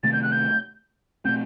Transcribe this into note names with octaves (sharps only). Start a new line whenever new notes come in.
C3 D#3 A3 C4 A6
G6
F#6
G6
B2 A3 C4 G6